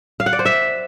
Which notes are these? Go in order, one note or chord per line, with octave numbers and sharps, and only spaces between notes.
F5
F#5
D5
C5
E5